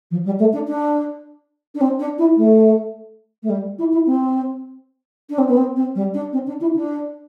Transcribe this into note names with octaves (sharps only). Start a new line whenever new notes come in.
F3
G3
A3
D4
D4
D4
C4
D4
E4
A3
A3
G3
E4
E4
C4
D4
C4
B3
C4
C4
G3
D4
C4
D4
E4
D4